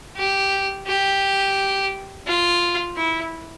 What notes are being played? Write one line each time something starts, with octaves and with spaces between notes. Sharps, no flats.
G4
G4
F4
E4